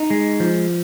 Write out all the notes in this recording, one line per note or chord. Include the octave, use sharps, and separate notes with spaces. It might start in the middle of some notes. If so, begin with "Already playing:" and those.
Already playing: D#4
G#3
F3